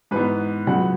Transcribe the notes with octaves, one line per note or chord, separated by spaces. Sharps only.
G#2 E3 B3 B4
C#2 C#3 F#3 B3 F#5